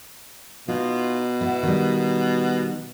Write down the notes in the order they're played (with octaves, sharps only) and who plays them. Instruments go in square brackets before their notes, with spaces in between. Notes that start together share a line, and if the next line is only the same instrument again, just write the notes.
[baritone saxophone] B2 [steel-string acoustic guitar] D#4 F4
[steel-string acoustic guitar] B3 E4
D#3 G3